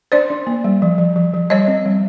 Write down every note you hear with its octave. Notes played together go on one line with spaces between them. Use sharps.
D4 C5 D5
D4
A#3
G3
F3
F3
F3
F3
G3 C#5 D#5
C4
G3